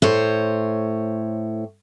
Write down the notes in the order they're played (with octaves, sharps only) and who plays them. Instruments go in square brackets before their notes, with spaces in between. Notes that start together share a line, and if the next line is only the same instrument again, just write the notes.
[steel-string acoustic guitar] A2 C5 C#5